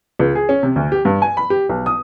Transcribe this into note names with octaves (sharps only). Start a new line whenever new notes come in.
C#2
G#4
C#4
C3
D2
G4
G2
G#5
B5
G4
B1
D#6